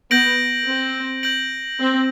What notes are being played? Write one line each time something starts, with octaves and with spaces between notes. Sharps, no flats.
B3 G6 A#6 D7 F#7
C4
G6 A#6 D7 F#7
C4